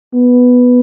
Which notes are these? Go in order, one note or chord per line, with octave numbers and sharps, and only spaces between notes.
B3